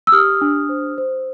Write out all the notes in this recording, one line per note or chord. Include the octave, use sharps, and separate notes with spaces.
E6
G4 D#6 F6
D4
C5
C5